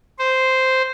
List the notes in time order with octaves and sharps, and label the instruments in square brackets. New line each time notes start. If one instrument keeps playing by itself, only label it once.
[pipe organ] C5